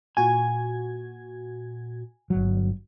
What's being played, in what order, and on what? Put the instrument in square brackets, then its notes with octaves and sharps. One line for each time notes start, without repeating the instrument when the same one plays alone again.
[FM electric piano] A#2 F#4 G#6 [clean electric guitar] G#5
[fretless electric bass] G1 F#3